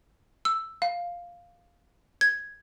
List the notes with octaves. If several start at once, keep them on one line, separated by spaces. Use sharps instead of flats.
E6
F5
G#6